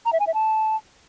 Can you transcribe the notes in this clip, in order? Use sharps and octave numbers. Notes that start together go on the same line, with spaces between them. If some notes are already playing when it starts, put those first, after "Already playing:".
A#5
E5
G#5
E5
A5